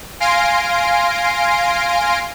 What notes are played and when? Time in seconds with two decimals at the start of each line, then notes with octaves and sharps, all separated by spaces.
0.20 F5 G#5 C6 A#6 C7 D7